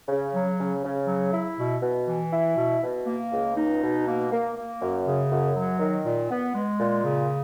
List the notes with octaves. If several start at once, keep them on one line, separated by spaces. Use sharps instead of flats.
C#3
F#3
C#3
C#3
F#3
E4
B2
B2
E3
E4
B2
B2
A#3
C#2
D#4
B2
A#3
A#3
A#3
F#2
C#3
F#2
F#3
D#3
A#2
B3
G#3
A#2
C#3